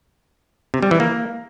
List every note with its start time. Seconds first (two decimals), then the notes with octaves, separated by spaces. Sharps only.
0.74 C3
0.83 G3
0.91 E3
1.00 A#3